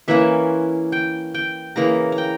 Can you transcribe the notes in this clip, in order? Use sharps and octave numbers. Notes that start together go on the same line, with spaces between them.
E3 A#3 C#4 E5
G5
G5
C#3 E3 A#3 A#5
A#5
G5